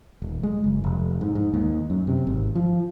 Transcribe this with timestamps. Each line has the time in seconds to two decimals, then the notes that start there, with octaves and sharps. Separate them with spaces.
0.22 D#1
0.43 G#3
0.64 F#1
0.84 F1
1.21 G#2
1.35 G#2
1.54 D#2
1.90 F#2
2.07 C3
2.27 G#1
2.55 F3